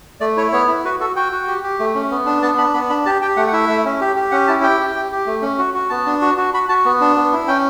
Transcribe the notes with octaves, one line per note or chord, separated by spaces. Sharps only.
A3 D5
E4 C#5
B3 C#5
E4
F#4 B4
F#4 A4
F#4 G5
F#4
G4
G4
A3
C#4
B3
D4
B3 A5
D4 B5
B3 B5
D4 B5
G4 A5
G4 G5
A3 F#5
F#5
E4 E5
A3
C#4
G4
G4
C#4 F#5
E4 A5
G4 G5
G4
G4
G4
A3
C#4
F#4
F#4
B3 A5
D4
F#4
F#4
F#4 B5
F#4 A5
B3
D4
B3
E4
C#4 G5